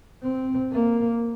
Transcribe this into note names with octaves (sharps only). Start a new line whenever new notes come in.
C4
A#3